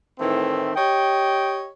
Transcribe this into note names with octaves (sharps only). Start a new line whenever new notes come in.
A2 D#3 E3 A3 C4
G4 C#5 D#5 G5